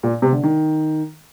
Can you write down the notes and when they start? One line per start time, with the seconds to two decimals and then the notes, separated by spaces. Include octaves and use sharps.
0.03 A#2
0.22 C3
0.32 D3
0.43 D#3